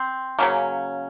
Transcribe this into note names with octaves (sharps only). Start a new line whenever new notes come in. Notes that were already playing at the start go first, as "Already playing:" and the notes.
Already playing: C4
C#3 F#3 A#3 C#4